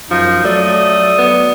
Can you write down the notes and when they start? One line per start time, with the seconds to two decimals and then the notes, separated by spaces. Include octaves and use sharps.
0.11 F#2 F3 D#4
0.44 F#3 A3 D5 D#6
1.19 B3